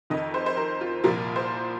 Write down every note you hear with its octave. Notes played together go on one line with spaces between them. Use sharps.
F2 D#3 D#5
C5
C5
A#4
F4
C2 A#2 F3 A#4
C5